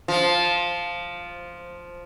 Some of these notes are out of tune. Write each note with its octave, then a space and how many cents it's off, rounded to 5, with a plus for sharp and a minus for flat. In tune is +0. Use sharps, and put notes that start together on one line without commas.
F3 +0 F4 +0